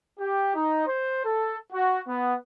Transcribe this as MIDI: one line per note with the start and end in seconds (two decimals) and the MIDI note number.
0.17 0.52 67
0.53 0.86 63
0.86 1.21 72
1.22 1.55 69
1.71 1.99 66
2.06 2.34 59